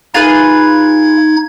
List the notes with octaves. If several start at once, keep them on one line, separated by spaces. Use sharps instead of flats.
D#4 F4 G#4 B4 G#6